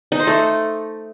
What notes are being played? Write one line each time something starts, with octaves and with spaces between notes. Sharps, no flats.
D#4
C5
A3